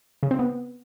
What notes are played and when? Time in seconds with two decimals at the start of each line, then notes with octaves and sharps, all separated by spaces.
0.23 C#3
0.31 C4
0.39 B3